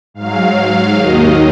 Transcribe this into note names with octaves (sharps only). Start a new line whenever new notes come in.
G#2 F#3 F5
D#2 D#3 F#3 D#5